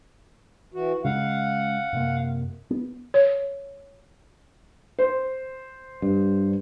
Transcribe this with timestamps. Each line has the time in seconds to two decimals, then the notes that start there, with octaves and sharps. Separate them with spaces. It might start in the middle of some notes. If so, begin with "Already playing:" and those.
0.74 E3 F#4
1.04 C#3 G#3 F5 F#5
1.93 F#2 C3 A#3
2.71 B3
3.14 C#5
4.99 C5
6.02 G2